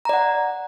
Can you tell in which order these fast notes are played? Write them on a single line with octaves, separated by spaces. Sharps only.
A#5 D5 F#5